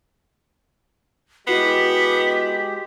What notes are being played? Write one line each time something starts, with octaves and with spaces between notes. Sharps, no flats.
G#3 B3 E4 F#4 G4 B6 C7